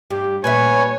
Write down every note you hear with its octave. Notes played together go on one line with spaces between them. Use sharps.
G2 G4
A#2 G3 B4 C#5 E5 G#5